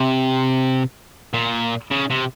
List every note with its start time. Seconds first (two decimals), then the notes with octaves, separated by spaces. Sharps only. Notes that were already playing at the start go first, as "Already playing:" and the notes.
Already playing: C3
1.34 A#2
1.91 C#3
2.10 C3